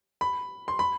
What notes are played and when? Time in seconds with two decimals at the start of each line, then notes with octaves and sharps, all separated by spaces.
0.21 B5
0.68 C6
0.79 B5